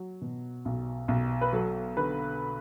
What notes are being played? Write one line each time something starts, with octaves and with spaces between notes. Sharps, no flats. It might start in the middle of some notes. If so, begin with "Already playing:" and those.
Already playing: F#3
B2
B1
B1
B4
F#3 A4
D3 B4